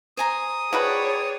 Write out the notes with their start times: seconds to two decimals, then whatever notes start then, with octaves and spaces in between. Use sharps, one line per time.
0.17 C5 G#5 A#5 D#6
0.73 F3 F#4 G#4 B4 C#5 D5 G5